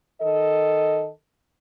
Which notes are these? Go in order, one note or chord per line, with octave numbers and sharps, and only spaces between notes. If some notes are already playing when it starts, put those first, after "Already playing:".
D#3 A4 D#5